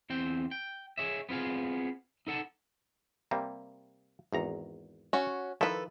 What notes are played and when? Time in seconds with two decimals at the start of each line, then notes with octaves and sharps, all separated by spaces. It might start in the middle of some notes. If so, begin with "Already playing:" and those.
0.10 E2 C4 G5
0.51 G5
0.97 G#4 C#5 D#5 E5
1.29 B3 C4 F4 G#4 F5
2.27 D#4 A4 F#5 A5
3.31 C3 G3 A#3
4.33 G#1 E2 A#5
5.13 C#4 F#4
5.61 D#3 F3 E4 A4 B4